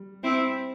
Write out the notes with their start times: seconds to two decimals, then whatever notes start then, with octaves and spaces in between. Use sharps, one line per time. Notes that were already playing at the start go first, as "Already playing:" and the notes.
Already playing: G3
0.23 C4 E4